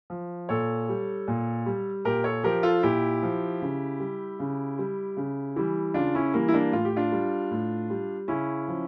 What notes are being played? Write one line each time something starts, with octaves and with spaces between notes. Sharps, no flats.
F3
A#2 A4 C#5
G3
A#2
G3
A#2 G4 A#4
A4 C#5
F3 G4 A#4
F4 A4
A#2 E4 G4
F3
C#3
G3
C#3
G3
C#3
E3 G3
C#3 D4 F4
C#4 E4
E3 G3 A#3
E4
A#3 D4
A2 F4
G4
D4 F4
G3
A2
G3
C#3 C#4 E4
F3